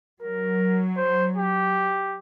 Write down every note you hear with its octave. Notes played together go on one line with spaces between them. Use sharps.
F#3 A#4
C5
G4